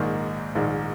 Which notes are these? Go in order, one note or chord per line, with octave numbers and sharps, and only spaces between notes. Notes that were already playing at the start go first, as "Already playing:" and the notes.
Already playing: A#1 G#2 D#3 A#3
A#1 G#2 D#3 A#3